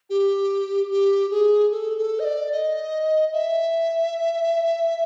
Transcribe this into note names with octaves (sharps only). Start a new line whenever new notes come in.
G4
G4
G#4
A4
A4
D#5
D5
D#5
E5